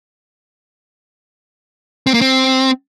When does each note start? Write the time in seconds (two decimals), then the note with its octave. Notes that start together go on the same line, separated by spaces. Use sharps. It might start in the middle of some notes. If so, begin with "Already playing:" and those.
2.07 C4
2.14 A#3
2.21 C4